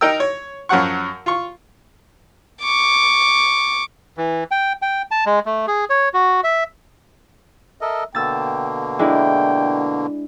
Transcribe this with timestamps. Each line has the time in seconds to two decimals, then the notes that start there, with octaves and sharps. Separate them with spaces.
0.01 D#4 A#4 G5 E6
0.20 C#5
0.69 F#2 F3 F#3 F#5 C#6
1.26 F4 C#6
2.62 C#6 D6
4.17 E3
4.51 G5
4.82 G5
5.11 A5
5.26 G#3
5.46 A3
5.67 G#4
5.90 C#5
6.14 F#4
6.44 E5
7.81 A4 A#4 D#5 E5
8.15 B2 D3 A#3 G5 E6 A6
8.99 G#3 D4 E4 G5